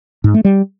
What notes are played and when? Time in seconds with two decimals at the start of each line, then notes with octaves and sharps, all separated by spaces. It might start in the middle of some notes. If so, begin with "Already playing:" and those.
0.24 G#2
0.34 A3
0.45 G3